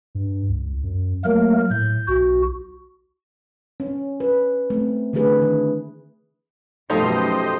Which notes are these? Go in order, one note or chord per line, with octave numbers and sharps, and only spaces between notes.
G2
C#2
F#2
F#3 A3 A#3 A#4
A2 G6
B1 F#4
C#4
B4
A3 C4
D3 E3 A3 D4 G#4 B4
D#3
F#2 B2 F3 A3 D#4 G4 C5 D#5